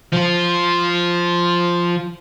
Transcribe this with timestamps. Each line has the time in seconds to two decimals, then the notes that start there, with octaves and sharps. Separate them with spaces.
0.13 F3 F4